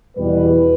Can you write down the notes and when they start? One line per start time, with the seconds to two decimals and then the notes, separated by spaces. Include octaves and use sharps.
0.17 E2 B2 G3 B4